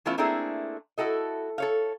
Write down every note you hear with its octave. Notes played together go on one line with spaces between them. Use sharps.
E3 A3 B3 C#4 E4 F4
A3 A#3 C4 D4 E4 G#4
E4 F#4 A4 D#5
A4 C#5 F5